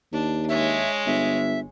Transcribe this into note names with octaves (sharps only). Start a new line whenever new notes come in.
D#2 D4
G#3 C#5 E5
G1 E5